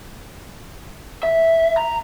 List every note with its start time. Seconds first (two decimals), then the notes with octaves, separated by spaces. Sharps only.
1.23 E5
1.77 A#5